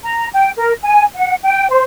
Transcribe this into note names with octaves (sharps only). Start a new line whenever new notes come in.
A#5
G5
A#4
G#5
F#5
G5
C5